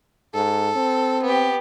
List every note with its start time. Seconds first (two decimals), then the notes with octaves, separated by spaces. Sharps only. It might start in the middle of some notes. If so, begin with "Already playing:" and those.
0.35 G#2 A4
0.76 C4
1.24 B3 G4